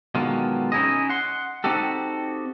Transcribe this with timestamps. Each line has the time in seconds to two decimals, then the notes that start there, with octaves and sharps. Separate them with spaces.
0.15 B2 D3 D#3 F#3 G#3 F4
0.72 C#4 D#4 E4 G#4 D#5
1.09 F#5 C6
1.64 C4 D#4 F#4 G4 A4